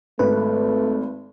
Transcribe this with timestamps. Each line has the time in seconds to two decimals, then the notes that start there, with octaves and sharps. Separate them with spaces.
0.19 G#1 A3 B4